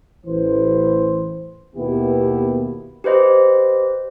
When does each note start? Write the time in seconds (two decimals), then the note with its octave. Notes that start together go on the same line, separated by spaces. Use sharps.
0.26 A1 E3 C5
1.76 D#2 B2 A#3 B3 E4 G4
3.04 G4 B4 C5 D#5